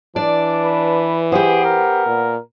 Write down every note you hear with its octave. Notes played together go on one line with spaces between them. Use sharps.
E3 D4 D5
B4
B3 G4 G#4 C5
A#4
A#2